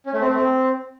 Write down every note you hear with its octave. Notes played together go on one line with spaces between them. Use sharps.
C#4
A3
C4
A3
C4